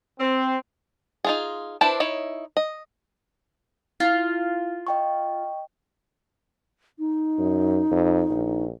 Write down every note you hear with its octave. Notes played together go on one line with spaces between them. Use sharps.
C4
D#4 F4 G#4
D4 E4 B4 C5 A5
D#4 E4 C#5
D#5
E4 F4
D#5 G5 C#6
D#4
F#2
F2
A#1